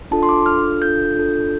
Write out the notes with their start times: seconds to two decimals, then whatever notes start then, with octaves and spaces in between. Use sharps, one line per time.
0.11 D4 F4 A4 A5
0.23 C6
0.29 D6
0.46 D4 F4 A4 F6
0.81 D4 F4 A4 G6
1.17 D4 F4 A4